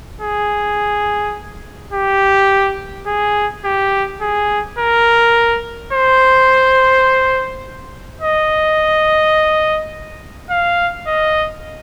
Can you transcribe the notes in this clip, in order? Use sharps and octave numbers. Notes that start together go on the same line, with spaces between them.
G#4
G4
G#4
G4
G#4
A#4
C5
D#5
F5
D#5